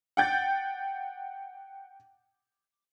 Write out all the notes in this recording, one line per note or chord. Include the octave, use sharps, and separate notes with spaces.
F#5 G5 G6 A6